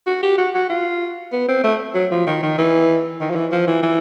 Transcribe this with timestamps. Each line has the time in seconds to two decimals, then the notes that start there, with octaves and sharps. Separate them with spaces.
0.07 F#4
0.22 G4
0.38 F#4
0.55 F#4
0.70 F4
1.33 B3
1.48 C4
1.64 A3
1.94 F#3
2.11 F3
2.27 D#3
2.42 D#3
2.58 E3
3.21 D#3
3.30 F3
3.35 E3
3.52 F3
3.68 E3
3.83 E3